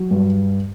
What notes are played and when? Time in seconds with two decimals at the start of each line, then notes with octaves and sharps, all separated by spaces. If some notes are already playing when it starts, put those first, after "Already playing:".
Already playing: F#3
0.11 G2